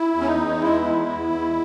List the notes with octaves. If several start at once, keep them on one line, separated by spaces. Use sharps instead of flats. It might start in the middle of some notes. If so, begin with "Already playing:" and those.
Already playing: E4
E2
C#4
D#4
E2
G#3 E4
E2
E2
E2